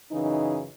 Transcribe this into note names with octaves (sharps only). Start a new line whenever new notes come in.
F#2 C#3 E3 D#4